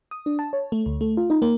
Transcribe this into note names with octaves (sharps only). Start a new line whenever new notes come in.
D#6
D4
A5
C#5
A3
D2
A3
F4
D#4
A#3